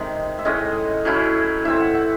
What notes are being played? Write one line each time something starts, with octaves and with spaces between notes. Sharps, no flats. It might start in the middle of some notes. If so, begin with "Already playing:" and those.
Already playing: C3 D#3 G#3
E5
A2 G#3 C#4 D#5
A2 F#3 C#4 E4
A2 E3 C4 E5
F#5
F#5